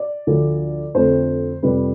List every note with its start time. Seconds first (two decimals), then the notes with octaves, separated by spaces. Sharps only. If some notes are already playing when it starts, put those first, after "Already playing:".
Already playing: D5
0.27 D2 D3 F3
0.95 F2 D3 A3 C4 C5
1.63 F2 C3 G3 B4